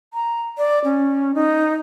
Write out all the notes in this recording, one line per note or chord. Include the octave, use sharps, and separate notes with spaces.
A#5
D5
C#4
D#4